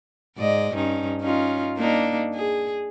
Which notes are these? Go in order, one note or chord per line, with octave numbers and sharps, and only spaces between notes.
G#2 D5 D#5
G2 C#4 D#4
C#4 D#4 F4
A#3 D4 D#4
G#4